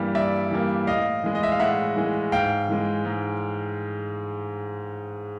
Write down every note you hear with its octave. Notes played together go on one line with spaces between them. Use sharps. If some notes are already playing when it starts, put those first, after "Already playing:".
Already playing: G2 E3 G3 A#3
G2 D5 E5
E3 G3 A#3
A2 D#5 F5
E3 G#3
D#5
E5
F5
A2 E5 F#5
E3 G#3
G#2 F5 G5
E3 G#3
G#2